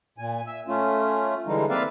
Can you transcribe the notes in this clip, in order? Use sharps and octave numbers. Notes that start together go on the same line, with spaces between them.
A#2 G#5
E5
A3 C#4 F4
D3 E3 G3 G#3 D#4
A#3 C4 B4 D5 E5 F5